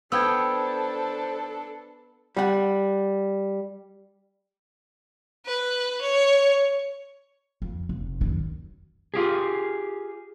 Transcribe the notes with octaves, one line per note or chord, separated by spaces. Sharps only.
B3 D4 A4 C5 G5 E6 G#6
G3 F#5
B4
C#5
F2
F1
F#2 D#3
F4 G4 G#4